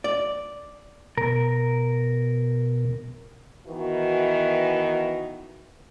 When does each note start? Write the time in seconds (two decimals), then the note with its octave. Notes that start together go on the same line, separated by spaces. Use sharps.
0.04 D5
1.17 B2 A#4
3.66 D#3 E3 B3 F#4